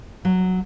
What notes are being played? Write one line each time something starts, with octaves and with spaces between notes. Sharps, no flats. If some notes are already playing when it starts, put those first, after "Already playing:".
F#3